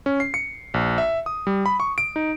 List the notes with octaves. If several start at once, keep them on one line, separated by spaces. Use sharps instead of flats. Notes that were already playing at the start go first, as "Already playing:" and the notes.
C#4
C7
C#7
A#1
E5
D#6
G3
B5
C#6
D7
D#4